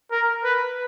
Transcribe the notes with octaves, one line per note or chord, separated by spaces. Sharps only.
A#4
B4